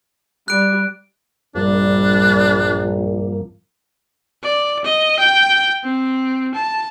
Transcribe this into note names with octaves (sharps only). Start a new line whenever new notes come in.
G3 F#6 D7
A#1 G2 F3 G3 A#3 D4
D5
D#5
G5
C4
A5